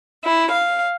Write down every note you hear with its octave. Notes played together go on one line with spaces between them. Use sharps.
E4
F5